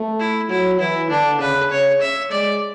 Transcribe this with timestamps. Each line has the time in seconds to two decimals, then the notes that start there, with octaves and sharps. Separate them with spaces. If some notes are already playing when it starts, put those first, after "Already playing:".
Already playing: A3
0.20 E4
0.50 F#3 E4
0.80 E3 E4
1.10 D3 D4
1.40 C#3 B4
1.70 C#3 C#5
2.01 E5
2.31 G#3 D5